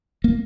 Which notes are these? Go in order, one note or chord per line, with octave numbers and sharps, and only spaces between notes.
A#3